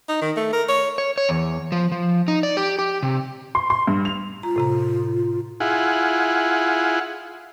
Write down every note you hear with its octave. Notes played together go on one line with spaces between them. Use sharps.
D#4
D#3
A3
A#4
C#5
C#5
C#5
E2
F3
F3
D#4
D5
G4
G4
C3
C6
C6
G2
F7
F4 A#5
A2 C3 A#5
E4 F4 G#4 F#5